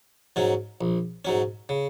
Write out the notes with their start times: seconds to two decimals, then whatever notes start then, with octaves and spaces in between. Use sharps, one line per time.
0.36 G#2 F#3 C#4
0.81 A#1
1.25 G#2 F#3 C#4
1.69 C#3